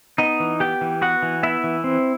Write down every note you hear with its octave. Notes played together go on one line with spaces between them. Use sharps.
B3 D#4 D#5
E3
B3 G4 G5
E3
B3 F#4 F#5
E3
B3 E4 E5
E3
C4